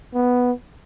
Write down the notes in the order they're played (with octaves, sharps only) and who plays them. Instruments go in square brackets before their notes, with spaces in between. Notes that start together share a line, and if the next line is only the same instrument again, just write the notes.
[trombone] B3